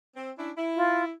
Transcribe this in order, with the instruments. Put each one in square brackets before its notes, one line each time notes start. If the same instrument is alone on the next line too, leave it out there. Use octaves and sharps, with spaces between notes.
[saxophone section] C4
C#4 D4 E4
E4
[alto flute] F4